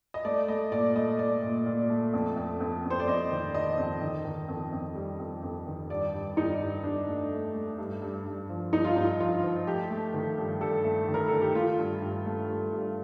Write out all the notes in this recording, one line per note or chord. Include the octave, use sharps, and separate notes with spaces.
D#5
A3 D5
A3 D#5
A#2 D5
A3 D#5
A3 D5
A#2
A#2
A3
F2
F2
F2
F2
C5
D5
F2 D#5
D#3
D#3 D#5
F2
D#3
D#3
F2
F2
G3
F2
F2
D#3
G2 D5
G2
G2 D#4
G2
G2 D4
A3
A3
A3
G2
G2
G2
F3
G2 D#4
F4
G2 D#4
F3 F4
F3
A3 G4
A3
D#3
G2
G2 A4
A3
D#3
A#4
D#3 A4
G4
A3 F4
G2
G2
A3
G2
G2